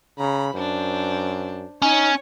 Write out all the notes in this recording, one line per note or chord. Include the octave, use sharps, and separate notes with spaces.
C#3 A#5 B5
F#2 D4 C5
C#4 D#4 C#5